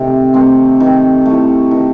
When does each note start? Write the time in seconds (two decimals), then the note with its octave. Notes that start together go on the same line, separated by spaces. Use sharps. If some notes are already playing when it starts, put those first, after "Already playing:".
Already playing: C3 D#3 A3 C4
0.34 D#3 A3 C4
0.80 D#3
1.26 A3 E4
1.71 D#3